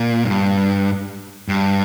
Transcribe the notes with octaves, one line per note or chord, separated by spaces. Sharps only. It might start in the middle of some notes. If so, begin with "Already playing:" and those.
Already playing: A#2
G2
G2